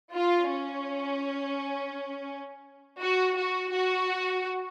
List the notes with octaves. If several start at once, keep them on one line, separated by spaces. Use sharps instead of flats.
F4
C#4
F#4
F#4
F#4